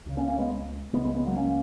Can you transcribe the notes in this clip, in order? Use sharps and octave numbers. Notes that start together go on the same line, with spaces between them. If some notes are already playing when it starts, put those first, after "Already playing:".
C#2 C#3
A#3 C#4
A#3 C#4
G#3 B3
C#2 C#3 G#3 B3
G#3 B3
G#3 B3
F#3 A#3
A#3 C#4